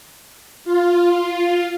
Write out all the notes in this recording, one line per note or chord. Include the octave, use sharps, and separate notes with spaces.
F4